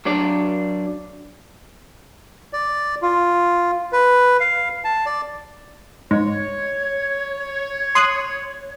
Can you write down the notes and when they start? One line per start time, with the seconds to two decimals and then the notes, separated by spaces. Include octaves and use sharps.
0.05 F#3 D4 D5
2.53 D5
3.02 F4
3.92 B4
4.40 F5
4.84 A5
5.06 D5
6.11 G#2 C#5
7.95 C6 D#6 F#6